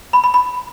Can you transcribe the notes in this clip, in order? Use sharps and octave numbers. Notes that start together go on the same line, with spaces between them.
B5
B5
B5